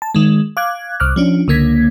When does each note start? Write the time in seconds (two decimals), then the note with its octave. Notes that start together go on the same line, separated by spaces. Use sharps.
0.02 A5
0.15 D#3 G#3
0.57 F5 D6 F#6 G#6
1.00 C2 D6 F6 F#6
1.16 F3 C#4 D4
1.48 C#2 D3 A#3 G#6 B6